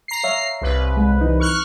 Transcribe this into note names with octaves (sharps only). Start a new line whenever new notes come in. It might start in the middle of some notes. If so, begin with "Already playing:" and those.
A#5 C7
C#5 E5 F5
C2 B4
G#3
E3 D#4
C#6 F6 F#6